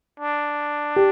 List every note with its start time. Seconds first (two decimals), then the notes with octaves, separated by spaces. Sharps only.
0.20 D4
0.96 G4